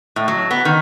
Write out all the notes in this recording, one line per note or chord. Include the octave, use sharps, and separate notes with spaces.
A2
F#3
B3
D#3